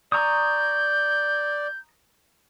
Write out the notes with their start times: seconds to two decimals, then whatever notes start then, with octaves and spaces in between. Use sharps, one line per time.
0.12 D5 A#5 C#6 D#6 G6